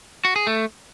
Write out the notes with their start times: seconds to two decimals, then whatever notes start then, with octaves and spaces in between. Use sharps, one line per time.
0.25 F#4
0.36 G#4
0.47 A3